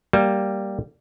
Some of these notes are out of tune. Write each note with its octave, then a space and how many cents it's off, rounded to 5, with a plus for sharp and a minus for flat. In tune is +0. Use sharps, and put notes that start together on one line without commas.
G3 +0 A#3 +0